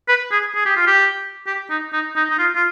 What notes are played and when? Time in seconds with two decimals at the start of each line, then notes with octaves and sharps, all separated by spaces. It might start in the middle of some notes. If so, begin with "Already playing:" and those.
0.08 B4
0.31 G#4
0.55 G#4
0.66 G4
0.76 F4
0.87 G4
1.47 G4
1.70 D#4
1.93 D#4
2.16 D#4
2.30 D#4
2.39 F4
2.56 F4